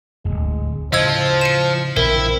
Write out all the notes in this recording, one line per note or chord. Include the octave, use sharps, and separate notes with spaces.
D1 G#1 G#3
A2 C#3 F3 C5 D#5 E6 G#6
C#7 D#7 E7
A#1 E3 C4 E4 A#4